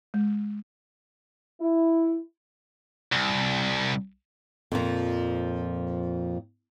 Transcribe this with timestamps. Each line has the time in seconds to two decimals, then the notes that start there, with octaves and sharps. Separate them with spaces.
0.14 G#3
1.61 E4
3.12 C2
4.72 F2 A#2 F3